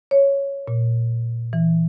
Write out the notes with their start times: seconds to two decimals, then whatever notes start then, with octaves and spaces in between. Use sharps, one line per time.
0.11 C#5
0.68 A#2
1.53 E3